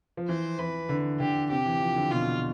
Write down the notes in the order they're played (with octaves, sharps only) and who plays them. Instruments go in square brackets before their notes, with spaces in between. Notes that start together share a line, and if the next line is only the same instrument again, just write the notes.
[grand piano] F3
[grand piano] E3 [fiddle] C5
[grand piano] E3 [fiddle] B4
[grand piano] D3
[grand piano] D3 [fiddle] G4
[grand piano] C3 [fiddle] G4
[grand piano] E3
F3
D3
[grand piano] B2 [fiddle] F4